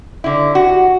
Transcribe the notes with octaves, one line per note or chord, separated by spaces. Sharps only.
D3 E4
F#4